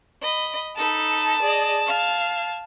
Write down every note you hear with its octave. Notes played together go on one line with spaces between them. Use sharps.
D#5 B5
D#4 A4 A5 B5
G#4 D5 D#5
F5 G#6